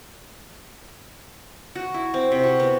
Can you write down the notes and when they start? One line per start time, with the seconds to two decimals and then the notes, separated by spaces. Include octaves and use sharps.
1.76 F#4
1.94 E4
2.14 C4
2.32 C3
2.43 F#4
2.60 B3